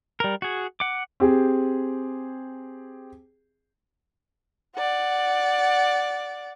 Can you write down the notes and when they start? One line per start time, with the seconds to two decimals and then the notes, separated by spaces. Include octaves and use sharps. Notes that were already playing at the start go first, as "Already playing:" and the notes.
0.20 G3 A#4
0.42 F#4 G#4
0.80 F#5 D6
1.20 C4 G4 G#4
4.76 D5 F#5